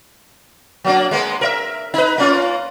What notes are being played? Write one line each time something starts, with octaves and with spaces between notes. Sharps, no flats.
F#3 A#3 D4
G#3 A#3 B3
A#4 C#5 E5
D#4 B4
A#3 C#4 F4